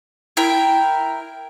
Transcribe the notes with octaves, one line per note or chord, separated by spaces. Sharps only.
E4 A#4 G5